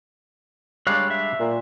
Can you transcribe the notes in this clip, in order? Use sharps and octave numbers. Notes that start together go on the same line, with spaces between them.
G3 G#3 D4 C#5 F5 F#6
E5
A#2